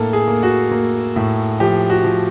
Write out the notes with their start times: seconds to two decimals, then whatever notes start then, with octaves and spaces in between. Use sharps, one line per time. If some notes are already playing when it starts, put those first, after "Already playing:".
Already playing: A2 A#3 A4
0.13 G#4
0.28 A#3
0.43 F#4
0.71 A#3
1.16 A2
1.60 F3 G4
1.90 F#4
2.04 F3